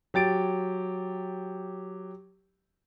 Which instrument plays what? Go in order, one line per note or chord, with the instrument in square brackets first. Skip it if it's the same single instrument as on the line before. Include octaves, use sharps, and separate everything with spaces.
[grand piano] F#3 G4 A6 D7